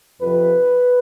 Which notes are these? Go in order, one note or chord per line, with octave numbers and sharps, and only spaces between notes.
F2 C3 F3 B4